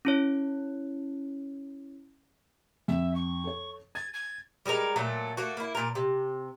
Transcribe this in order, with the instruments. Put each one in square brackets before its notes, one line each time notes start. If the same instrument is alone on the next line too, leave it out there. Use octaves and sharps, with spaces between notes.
[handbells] C#4 E4 C#5
[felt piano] F2 [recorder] E5
[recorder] C#6
[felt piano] A4 C#5
[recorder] G#6 [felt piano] A6
[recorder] G#6
[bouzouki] G3 G#3 D#4 A#4
A#2 F#3 A3
A3 A#3 F#4
A#3 E4
A#2 A#4
C3